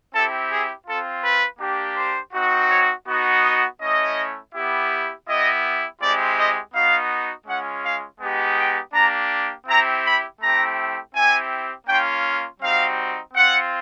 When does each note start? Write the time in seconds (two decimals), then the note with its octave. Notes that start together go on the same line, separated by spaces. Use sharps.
0.13 C4 E4 G4 A4
0.50 G#4
0.86 C4 F4 A4
1.23 B4
1.60 A#3 D4 G4
1.97 C5
2.33 C4 D#4 F#4
2.70 C#5
3.07 B3 D#4 F#4
3.43 D#5
3.80 A3 C#4 E4 D#5
4.54 B3 E4 G4
5.27 B3 E4 G4 D#5
6.01 G#3 C4 E4 G4 D5
6.37 D#5
6.73 B3 D#4 F#4 F5
7.47 G#3 C#4 F4 F#5
7.84 F5
8.21 G#3 B3 D#4 G4
8.57 G5
8.94 A#3 D4 G4 A#5
9.67 C4 E4 G4 A#5
10.04 B5
10.40 A3 C4 E4 G4 A#5
11.14 C4 E4 G4 G#5
11.87 A#3 C#4 F4 G5
12.61 G3 C4 D#4 F#4 F5
13.34 C4 F4 F#5